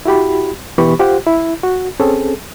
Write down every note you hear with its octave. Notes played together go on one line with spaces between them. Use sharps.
E4 F#4 G4 B5
B2 E3 B3 G4 B5 C#6
F4 G4 C5 F#5
E4
F#4
C4 C#4 G#4 A4